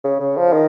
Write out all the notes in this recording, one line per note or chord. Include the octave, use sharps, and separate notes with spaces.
C#3
C#3
F3
D#3